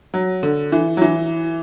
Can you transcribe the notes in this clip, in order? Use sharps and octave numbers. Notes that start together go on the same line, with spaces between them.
F#3
D3
E3
F#3
E3